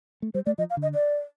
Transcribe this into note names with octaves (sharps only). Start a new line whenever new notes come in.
A3
G3 C5
A3 D5
F3 D#5
F5
D3
D#5
D5